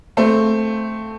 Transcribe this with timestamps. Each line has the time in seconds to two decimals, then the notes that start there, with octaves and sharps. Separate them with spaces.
0.17 A3 C4